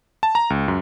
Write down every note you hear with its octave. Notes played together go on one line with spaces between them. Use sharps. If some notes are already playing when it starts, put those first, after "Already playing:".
A5
A#5
C#2
F#2